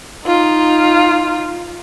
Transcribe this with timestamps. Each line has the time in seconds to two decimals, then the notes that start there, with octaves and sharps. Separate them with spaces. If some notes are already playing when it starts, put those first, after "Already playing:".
0.25 D#4 F4